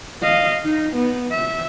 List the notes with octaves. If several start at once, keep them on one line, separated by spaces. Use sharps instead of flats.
D#5 F5
D#4
B3
E5